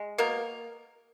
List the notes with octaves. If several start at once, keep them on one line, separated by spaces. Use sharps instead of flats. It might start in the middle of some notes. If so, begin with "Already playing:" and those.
Already playing: G#3
B2 A#3 A#4